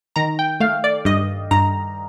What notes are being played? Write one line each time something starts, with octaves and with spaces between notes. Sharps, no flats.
D#3 A#5
G5
A3 F5
D5
G2 D#5
G2 A#5